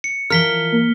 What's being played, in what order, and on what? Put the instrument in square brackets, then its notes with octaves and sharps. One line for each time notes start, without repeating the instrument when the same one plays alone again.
[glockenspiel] C#7
[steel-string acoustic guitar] E3 F3 F4 [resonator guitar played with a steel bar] A#4 [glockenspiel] F6 B6 G7
[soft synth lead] A#3